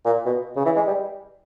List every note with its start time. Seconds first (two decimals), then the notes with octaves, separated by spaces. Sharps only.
0.06 A#2
0.26 B2
0.56 C#3
0.66 E3
0.76 G#3
0.87 G3